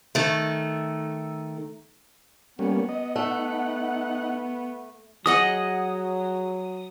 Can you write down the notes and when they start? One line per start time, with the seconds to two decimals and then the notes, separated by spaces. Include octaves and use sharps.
0.15 D#3 A3
2.59 G3 A#3 B3 C#4
2.89 D#5
3.16 A3 D#4 F#5
5.26 F#3 G#4 D#5 F#5 D#6